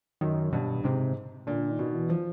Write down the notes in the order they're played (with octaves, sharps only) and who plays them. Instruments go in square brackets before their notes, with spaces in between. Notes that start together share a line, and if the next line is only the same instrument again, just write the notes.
[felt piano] F#2 [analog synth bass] D#3
[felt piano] G2 [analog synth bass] B2
[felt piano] G#2 [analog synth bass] C3
[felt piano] A#2 [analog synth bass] D3
[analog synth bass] D#3
[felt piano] B2
[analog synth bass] E3
[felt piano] F3